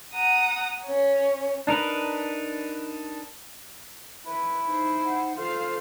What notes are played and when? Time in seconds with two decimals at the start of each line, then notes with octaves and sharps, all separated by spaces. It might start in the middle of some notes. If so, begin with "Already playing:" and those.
0.14 F#5 A#5 D#6
0.84 C#4 C#5
1.67 D4 D#4 A#4 B4
4.26 E4 B4
4.67 D#4 C5
5.04 F#5
5.37 F4 A4 C5 F5